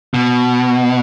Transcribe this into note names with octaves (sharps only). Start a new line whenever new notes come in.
B2